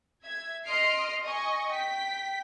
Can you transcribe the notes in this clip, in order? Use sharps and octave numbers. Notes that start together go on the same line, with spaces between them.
E5 G#6
D#5 C6 F6 C7 D7
D#5 G#5 C#6
G5 B6